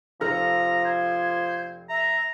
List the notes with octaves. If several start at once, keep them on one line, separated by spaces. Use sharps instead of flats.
F1 F3 A4 A#5 F6
C5 G#6
E5 A#5